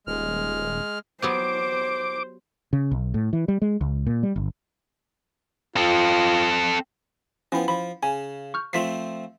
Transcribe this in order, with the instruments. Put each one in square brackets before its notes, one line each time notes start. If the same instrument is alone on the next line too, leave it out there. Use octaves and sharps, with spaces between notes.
[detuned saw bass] D#1 [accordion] G#3 F6
[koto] F#3 B3 G4 [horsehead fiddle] C5 [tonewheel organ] D6
[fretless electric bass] C#3
B1
A2
E3
G3
G#3
C#2
A#2
G3
G1
[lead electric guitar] C4 A4 [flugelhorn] F4
[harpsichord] F3 B3 [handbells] C#4 E4 G5
[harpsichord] F3 [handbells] B5
[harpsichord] C#3 [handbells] G#5
[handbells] C#6 F6 G6
[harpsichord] F3 A3 C4 [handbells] F4 B6 C7